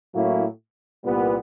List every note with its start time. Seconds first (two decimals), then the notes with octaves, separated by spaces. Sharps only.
0.13 A2 F#3 A#3 C#4 E4
1.04 C2 A#2 G3 B3